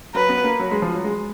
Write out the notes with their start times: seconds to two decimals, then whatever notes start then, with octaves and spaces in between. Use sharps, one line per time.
0.15 F#3 B4
0.29 B3
0.44 A#3
0.59 F#3
0.71 G#3
0.82 F3
0.93 F#3
1.04 G#3